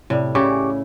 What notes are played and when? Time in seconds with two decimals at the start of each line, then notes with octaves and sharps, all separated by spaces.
0.10 A2 C3 G3
0.35 C#3 E4 G4 C#6 D6